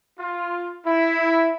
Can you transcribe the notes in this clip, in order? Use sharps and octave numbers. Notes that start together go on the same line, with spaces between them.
F4
E4